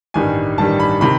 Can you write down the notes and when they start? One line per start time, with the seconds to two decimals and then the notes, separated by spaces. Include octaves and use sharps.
0.14 A1 G2 D#3 G3 G#5
0.58 A1 G2 D#3 G3 A5
0.80 B5
1.01 C3 D#3 B5